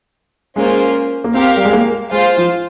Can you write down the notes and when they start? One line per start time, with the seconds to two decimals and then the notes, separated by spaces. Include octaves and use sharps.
0.56 G#3 A#3 C#4 F4 C5
1.24 A#3
1.34 C4 G4 A#4 F5
1.57 G3
1.65 G#3
1.73 A#3
2.12 G#3 F4 C5 F5
2.37 F3